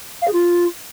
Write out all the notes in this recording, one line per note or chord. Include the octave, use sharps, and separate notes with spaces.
F5
G#4
F4